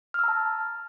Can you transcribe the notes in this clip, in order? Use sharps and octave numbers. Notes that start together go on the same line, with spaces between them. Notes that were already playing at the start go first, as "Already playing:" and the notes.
A5 A#5 E6 F6